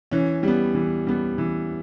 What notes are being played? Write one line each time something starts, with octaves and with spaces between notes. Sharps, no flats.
E3 C#4
G3 B3
E3
G3 B3
E3